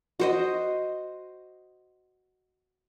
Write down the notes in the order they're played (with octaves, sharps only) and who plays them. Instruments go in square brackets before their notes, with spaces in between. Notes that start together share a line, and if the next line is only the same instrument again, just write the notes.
[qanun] F#4 C5 D#5